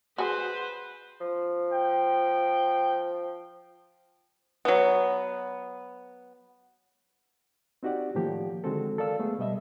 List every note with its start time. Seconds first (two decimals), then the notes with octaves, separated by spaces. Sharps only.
0.18 F#4 G#4 B4 C5
1.21 F3
1.73 G5
4.65 F#3 B3
7.83 C4 D#4 F#4 G4 D5 F#5
8.15 A2 D#3 F3 A#3 G4
8.64 D3 D#3 G#3 C4 F#4 A4
8.98 A4 A#4 D5 F5 E6
9.19 G#3 A3 B3 G#4
9.39 B2 G3 D#5 E5